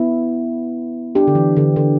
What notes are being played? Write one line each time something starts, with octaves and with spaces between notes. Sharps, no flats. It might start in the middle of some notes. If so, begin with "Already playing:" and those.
Already playing: B3 E4
D4 G4
D3
E3
D3
D3